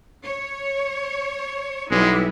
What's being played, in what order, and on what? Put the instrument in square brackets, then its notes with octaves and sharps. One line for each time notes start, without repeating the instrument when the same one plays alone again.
[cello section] C#5
[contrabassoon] B1 [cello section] G3 B3 E4 [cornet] G#3